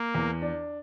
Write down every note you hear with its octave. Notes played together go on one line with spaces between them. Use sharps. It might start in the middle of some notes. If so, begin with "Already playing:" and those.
Already playing: A#3
E2
D4